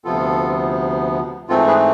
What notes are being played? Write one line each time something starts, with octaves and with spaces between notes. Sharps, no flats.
D2 C3 F3 B3 F4 A4
G#2 E3 A3 C4 F4 A4
G#4 B4